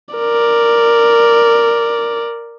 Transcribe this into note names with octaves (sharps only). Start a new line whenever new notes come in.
A#4 D5